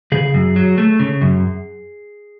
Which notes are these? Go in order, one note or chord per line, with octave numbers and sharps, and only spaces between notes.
C#3 G#4
F#2
F#3
A3
C#3
F#2